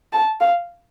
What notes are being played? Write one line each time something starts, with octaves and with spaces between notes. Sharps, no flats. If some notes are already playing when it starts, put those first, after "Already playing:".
A5
F5